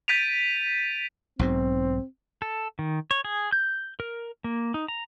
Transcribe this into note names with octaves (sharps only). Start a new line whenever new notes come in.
G6 A6 B6 D7 D#7 F7
B1 G#2 B2 C4
A4
D#3
C#5
G#4
G6
A#4
A#3
D#4
A#5